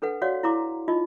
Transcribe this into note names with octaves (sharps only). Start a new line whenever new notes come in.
D4 A4 B4 F#5
F#4 C#5 D5 F5 F#5
E4 F5 A#5 C6 D6
D#4 F4 D#5